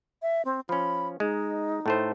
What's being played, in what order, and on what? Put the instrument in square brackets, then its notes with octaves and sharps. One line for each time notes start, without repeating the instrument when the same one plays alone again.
[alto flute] E5
C4
[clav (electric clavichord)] F3 C#4 [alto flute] B5
[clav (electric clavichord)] G#3 [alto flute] D#4
[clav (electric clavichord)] A2 A3 C5